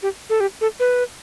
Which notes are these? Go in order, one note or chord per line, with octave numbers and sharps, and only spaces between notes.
G4
A4
G4
A4
B4